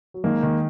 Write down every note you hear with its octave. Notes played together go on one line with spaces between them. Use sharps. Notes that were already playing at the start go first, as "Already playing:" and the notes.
F#3
D#3 G#3 A#3
D#3